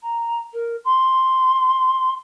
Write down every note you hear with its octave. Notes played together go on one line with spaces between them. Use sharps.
A#5
A#4
C6